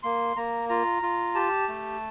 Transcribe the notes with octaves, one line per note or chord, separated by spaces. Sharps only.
A#3 C6
A#3 A#5
F4 A#5
F4
G4 A5
A3